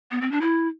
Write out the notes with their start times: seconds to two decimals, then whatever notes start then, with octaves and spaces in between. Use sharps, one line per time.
0.11 B3
0.21 C4
0.31 D4
0.41 E4